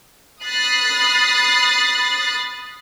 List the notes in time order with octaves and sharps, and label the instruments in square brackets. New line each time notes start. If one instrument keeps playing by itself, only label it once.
[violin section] B5 D#6 F#6 A6 C7